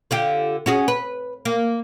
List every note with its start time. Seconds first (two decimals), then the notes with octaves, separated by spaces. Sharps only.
0.11 D3 F4 G4
0.66 C#4 F#4 G#4
0.88 B4
1.45 A#3